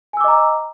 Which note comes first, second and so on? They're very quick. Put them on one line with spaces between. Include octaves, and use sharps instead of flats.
G#5 E6 D6 D#5 A#5